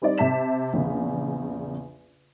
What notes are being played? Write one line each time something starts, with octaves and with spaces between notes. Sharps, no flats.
G3 C4 D#4 D5 D#5
C3 E5 A5 B6 E7
A#1 E2 C#3